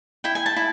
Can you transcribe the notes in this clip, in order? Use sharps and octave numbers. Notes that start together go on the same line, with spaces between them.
E4 G5
G#5
A5
E4